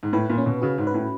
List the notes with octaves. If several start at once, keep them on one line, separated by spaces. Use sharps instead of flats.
G#2
A2 B4
A#2
C#4
B2
C#3 F#4
G#2
B4
A2